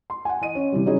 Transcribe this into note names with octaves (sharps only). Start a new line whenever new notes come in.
C6
F#5 G#5
E3 D#5 D#7
C#4
C3 E3 G3
F#3 C#4 D#4 E4 G#4